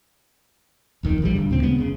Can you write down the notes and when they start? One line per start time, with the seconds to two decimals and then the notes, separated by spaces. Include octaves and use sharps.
1.03 D#1 F2 D#3
1.22 A#1 F3 G3
1.35 E1 G2 D3
1.50 D2 A#2 C#3 C4
1.63 C#3 G#3 B3 C4
1.78 F1 C#3